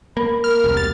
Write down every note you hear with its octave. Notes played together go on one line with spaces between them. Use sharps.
A#3 B5
A#4 F6
E1 C2
A6